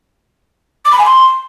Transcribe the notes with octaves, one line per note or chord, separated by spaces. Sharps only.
D6
B5
G#5
C6